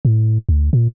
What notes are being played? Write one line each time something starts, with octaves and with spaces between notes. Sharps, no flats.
A2
D2
A#2